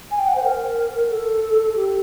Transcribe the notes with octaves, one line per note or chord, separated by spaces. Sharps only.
G#5
G5
F#5
C5
A#4
A4
G4